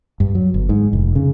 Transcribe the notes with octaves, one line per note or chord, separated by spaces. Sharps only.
G2
F#3
G1
G#2
F1
C#3